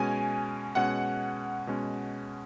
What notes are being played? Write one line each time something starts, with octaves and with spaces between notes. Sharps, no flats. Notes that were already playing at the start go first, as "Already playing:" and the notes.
Already playing: B2 G#3 C#4 G#5
B2 G#3 C#4 F#5
B2 G#3 C#4